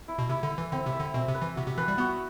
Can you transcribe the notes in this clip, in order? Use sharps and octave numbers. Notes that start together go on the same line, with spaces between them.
E4
B2
C3 E4
D3
E4
E3
D3 C4
C3
E5
D3
B2 C4
C3
B4
E3
C3 F#4
C3
E3 B4
G3
B3 F#4